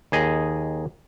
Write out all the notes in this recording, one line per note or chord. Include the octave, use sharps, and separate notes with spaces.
D#2 G#4 D#5